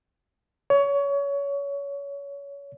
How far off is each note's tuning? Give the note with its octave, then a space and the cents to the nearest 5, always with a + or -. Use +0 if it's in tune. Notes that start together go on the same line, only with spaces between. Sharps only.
C#5 +25